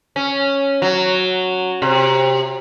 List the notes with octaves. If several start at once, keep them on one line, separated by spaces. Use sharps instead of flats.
C#4
F#3
C3